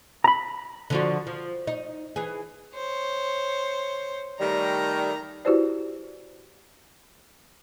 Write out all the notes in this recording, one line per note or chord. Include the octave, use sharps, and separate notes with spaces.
A#5 B5
D3 F3 F#4
F3
D#4
E3 G#4
C5 C#5
D#3 G3 A3 D5 A#5
E4 F#4 G4 B4 C5 D5